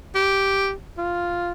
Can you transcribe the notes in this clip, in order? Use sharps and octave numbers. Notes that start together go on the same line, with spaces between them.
G4
F4